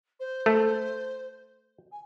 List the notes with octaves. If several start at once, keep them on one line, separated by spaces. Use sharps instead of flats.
C5
A3
G#5